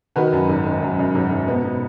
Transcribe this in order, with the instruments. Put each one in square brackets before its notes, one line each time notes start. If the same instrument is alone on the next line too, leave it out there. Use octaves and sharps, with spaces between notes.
[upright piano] D#3 F#4 B4
F#2
G#1
D#3
F#2
F#2
G#1
G#1
B2 B3
B2